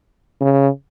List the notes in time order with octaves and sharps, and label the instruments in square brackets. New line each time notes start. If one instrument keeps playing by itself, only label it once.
[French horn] C#3